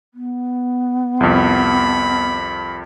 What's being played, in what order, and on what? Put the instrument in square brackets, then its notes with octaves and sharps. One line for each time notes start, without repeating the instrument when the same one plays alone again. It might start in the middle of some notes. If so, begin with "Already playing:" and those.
[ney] B3
[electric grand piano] C2 F2 [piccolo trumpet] B5